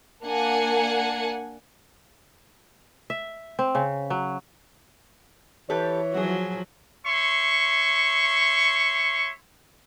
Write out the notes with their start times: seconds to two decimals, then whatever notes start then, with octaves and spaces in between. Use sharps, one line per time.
0.23 A#3 D4 F#5 G#5
3.10 E5
3.59 C4
3.75 C#3
4.10 F#3
5.70 E3 G4 A4 B4 C#5
6.14 F3 F#3 F#4 G#4
7.06 C#5 E5 C6 C#6